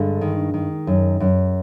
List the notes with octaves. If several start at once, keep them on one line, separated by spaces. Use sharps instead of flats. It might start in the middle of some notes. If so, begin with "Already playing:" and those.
Already playing: G2 D3 G#3
D#3
D#3
F#2
F#2